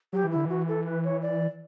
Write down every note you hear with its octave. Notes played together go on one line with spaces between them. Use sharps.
F#3 G4
E3
D3 E4
E3 F#4
A4
B4
C#5
D5